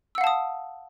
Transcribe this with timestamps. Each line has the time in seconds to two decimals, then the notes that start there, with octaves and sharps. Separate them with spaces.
0.15 E6
0.18 F#5
0.21 F5
0.24 A5
0.27 D#6